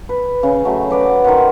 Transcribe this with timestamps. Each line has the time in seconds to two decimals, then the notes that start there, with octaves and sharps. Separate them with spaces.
0.09 B4
0.43 C#3
0.65 F#3 A3
0.91 B4 D5 F#5 A#5
1.24 D#3 A#4 C5 F#5